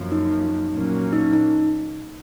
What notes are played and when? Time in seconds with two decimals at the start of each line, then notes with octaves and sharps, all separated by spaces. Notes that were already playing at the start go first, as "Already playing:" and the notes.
Already playing: F#2 F3 A#3 C#4
0.12 D#4
0.72 A#2 F#3 A#3 C#4
1.13 D#4
1.33 D#4